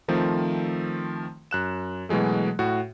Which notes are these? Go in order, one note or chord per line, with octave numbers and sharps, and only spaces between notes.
D#3 F3 A3 C4
F#2 F#6 E7
B2 E3 F#3 G#3 A3
A2 F#4